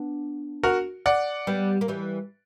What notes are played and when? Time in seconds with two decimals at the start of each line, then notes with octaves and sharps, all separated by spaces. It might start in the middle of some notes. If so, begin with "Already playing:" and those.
Already playing: B3 D4
0.63 F#4 A#4
1.06 D5 F#5
1.47 G3 B3
1.81 A#3
1.88 E3 G3